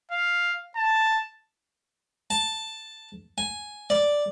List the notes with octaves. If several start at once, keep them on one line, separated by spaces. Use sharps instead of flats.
F5
A5
A5
G#5
D5